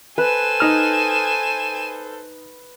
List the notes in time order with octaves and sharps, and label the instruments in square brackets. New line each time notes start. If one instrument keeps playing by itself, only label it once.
[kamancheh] A4 C5 [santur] B4 [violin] G#5 E7
[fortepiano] D#4 F6